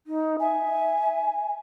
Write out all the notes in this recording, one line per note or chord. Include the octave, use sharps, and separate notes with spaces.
D#4
E5 G#5